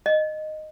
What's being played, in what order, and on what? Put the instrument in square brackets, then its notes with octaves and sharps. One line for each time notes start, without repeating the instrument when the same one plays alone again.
[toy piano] D#5